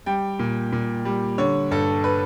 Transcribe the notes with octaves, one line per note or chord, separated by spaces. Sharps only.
G3 G5
A#2
A#2
G3
D3 C#5
G2 A4
B4